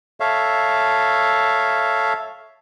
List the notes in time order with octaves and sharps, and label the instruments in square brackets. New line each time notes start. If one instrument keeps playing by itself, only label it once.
[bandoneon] A4 C#5 E5 F5